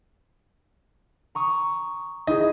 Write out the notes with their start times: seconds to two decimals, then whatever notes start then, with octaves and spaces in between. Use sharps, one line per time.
1.35 A#5 C#6 D#6
2.27 D#4 E4 G#4 D#5